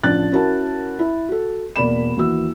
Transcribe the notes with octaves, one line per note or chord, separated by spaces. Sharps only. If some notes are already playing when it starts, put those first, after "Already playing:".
A1 F3 D4 D5 F#6 A6
C#4 E4 F#4 A#4 A5
E4
F#4 A4
E1 A#3 D5 B5 E7
D#2 E3 F#4 E6